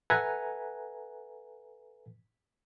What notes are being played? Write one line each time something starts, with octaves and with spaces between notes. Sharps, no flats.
A4 B4 E5 F#5 G#5 A#5